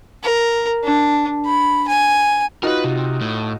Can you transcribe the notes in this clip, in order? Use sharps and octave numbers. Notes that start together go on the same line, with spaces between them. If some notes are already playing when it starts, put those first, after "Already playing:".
A#4
D4
B5
G#5
D#4 F4 F#4 A#4 B4
C3
A2